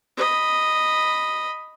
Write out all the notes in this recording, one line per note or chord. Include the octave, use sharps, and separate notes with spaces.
D#5 B5